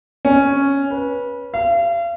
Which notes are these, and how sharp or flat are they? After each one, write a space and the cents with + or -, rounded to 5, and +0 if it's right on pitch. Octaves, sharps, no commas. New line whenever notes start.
C#4 +0
B4 -25
F5 -40